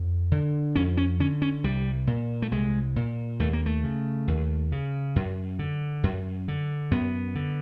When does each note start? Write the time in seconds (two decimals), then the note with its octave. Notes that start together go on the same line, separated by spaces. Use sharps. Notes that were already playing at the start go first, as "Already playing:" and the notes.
Already playing: F2
0.32 D3
0.76 F2 C#4
0.97 C#4
1.20 D3 C#4
1.42 C#4
1.64 C2 G3
2.07 A#2
2.42 A3
2.51 C2 G#3
2.96 A#2
3.39 D#2 A3
3.53 A#3
3.66 A3
3.84 C#3
4.28 D#2
4.72 C#3
5.16 F#2
5.59 D3
6.03 F#2
6.48 D3
6.91 F#2 B3
7.35 D3